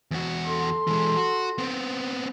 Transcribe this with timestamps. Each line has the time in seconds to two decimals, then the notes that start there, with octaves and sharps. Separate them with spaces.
0.11 E2 F#4
0.47 A4 C6
0.87 E3 G#3
1.17 F#4
1.58 B3 C4